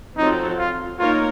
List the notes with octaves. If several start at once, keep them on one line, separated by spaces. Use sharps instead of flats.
F3 C4 D#4 F#4 A4 C#5
F4
A#3 D#4 F4 A#4 C#5